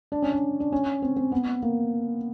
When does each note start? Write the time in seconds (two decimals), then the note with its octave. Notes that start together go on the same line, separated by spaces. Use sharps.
0.12 D4
0.22 C#4
0.32 D4
0.60 D4
0.72 C#4
1.02 C4
1.16 C4
1.32 B3
1.62 A#3